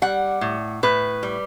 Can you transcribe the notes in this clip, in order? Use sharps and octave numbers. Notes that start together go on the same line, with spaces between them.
G3 F#5
A2
A2 B4
G3